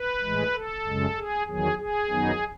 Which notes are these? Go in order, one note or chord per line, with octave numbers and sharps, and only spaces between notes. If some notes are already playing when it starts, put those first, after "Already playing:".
Already playing: B4
A2 E3 G#3
A4
F#2 C#3 G#3
G#4
E2 D#3 F#3 G#4
G#4
F#2 D#3 F#3 B3 D#4